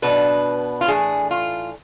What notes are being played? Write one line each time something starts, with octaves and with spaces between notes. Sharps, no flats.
B2 B3 D4 B4
F4
A2 E3 A3 D4 G#4
F4